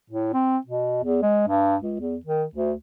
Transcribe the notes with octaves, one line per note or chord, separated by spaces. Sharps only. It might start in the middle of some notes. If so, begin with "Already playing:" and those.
A2
C4
B2
E2
G#3
G2
C#2
E2
D#3
D2